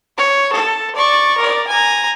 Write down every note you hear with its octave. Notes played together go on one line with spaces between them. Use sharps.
C#5
A4
D5 C#6
A#4 D5
G#5 A#5